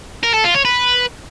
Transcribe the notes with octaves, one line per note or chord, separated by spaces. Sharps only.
A#4
A4
F4
C#5
B4